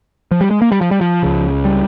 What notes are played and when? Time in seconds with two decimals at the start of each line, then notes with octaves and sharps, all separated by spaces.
0.31 F3
0.41 G3
0.51 G#3
0.62 A#3
0.72 G3
0.81 F3
0.91 G3
1.01 F3
1.23 C#2 C#3
1.65 G3